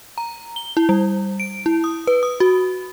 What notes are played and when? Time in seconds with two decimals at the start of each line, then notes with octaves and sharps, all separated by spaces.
0.18 A#5
0.56 G7
0.77 E4
0.89 G3
1.40 D7
1.66 E4
1.84 D#6
2.07 B4
2.23 D#6
2.40 F#4